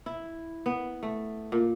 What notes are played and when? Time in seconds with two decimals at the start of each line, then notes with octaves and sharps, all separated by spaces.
0.06 E4
0.66 B3
1.03 A3
1.52 A#2